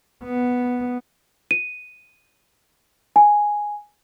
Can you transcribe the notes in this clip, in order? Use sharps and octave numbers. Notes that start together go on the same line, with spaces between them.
B3
D#7
G#5